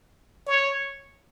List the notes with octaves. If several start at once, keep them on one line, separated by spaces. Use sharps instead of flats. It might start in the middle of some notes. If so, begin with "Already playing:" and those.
C#5